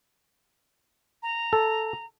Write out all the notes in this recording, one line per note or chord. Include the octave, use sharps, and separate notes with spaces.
A#5
A4